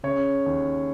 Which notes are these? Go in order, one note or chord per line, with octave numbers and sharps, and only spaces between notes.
C#3 C#5
D#2